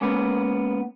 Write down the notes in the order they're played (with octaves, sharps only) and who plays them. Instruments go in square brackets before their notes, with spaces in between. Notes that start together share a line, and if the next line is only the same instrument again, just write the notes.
[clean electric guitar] G#3 A#3 B3 C#4